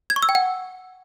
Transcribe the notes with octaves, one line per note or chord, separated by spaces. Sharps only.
G#6
C#6
E6
G5
F#5